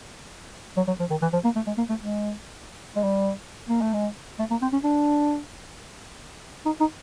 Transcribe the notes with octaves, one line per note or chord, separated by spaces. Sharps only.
F#3
F#3
F3
D#3
E3
F3
A#3
A3
G#3
A#3
A3
G#3
G#3
G3
A#3
A3
G#3
A3
A#3
C4
C#4
D4
D#4
D#4